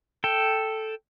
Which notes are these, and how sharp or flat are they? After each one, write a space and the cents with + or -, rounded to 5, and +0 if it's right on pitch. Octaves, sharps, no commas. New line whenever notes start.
A4 +0 G5 +0